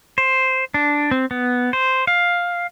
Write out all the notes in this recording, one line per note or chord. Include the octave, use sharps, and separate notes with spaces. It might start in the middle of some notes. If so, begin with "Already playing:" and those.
C5
D4
C4
B3
C5
F5